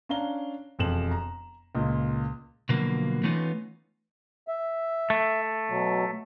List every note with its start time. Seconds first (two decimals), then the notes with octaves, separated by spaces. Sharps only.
0.09 C#4 D4 F5 A#5 G7
0.79 E1 F2 A4 E7 F#7
1.11 A#5
1.75 C#2 A#2
2.69 B2 D3 F3 F#3 A#3
3.23 E3 A3 B3 C#4 D#4 F4
4.48 E5
5.10 A3
5.69 B2 F#3